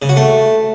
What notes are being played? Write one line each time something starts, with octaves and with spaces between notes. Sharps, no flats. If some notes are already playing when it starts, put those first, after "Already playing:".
C#3
F#4
A3